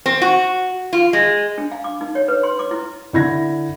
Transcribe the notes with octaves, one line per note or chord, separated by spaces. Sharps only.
C4
F#4
F4
G#3
D4
F5
D6
D#4
C#5
B4
C6
D6
E4
D3 E4 G#6 A#6